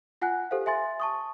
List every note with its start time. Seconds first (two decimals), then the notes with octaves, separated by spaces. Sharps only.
0.22 F4 F#5 G#5 F#6
0.51 G4 A4 C5 F5
0.66 E5 G#5 C6 A6
1.00 A5 C#6 D#6